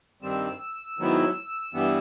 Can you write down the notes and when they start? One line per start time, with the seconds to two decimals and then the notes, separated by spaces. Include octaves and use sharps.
0.22 G2 D#3 G3 C4 E6
0.98 G#2 D#3 F#3 B3 E4
1.74 G2 E3 G3 B3